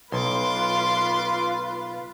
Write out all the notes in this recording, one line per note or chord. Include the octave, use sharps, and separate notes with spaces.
B1 F4 B4 C6 D6